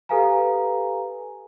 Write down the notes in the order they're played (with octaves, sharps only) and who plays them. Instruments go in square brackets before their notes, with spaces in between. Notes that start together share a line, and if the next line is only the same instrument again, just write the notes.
[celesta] G4 A4 B4 F5 G#5 A#5